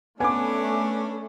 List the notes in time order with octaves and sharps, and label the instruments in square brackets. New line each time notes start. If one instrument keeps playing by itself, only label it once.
[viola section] A3 [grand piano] B3 D6 [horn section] C#4 D4 B4 [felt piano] G#5